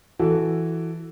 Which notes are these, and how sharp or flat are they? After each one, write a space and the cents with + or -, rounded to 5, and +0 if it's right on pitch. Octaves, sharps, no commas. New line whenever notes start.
E3 +0 F#4 +0 A4 +0